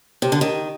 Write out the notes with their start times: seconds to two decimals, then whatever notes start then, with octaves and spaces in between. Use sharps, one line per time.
0.22 C3
0.32 D3
0.41 D#3